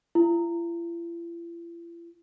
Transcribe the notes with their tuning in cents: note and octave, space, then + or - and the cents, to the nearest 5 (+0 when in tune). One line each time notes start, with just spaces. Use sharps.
E4 +45